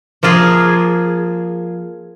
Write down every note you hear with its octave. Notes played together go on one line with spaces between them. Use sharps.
F3 A#3 F4 G#4